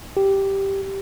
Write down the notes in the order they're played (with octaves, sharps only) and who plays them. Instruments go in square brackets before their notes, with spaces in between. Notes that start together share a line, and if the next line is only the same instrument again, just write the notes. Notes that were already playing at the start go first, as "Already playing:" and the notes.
[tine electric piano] G4